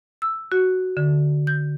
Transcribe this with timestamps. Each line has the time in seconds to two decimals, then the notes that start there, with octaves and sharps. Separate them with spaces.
0.22 E6
0.52 F#4
0.97 D3
1.47 G6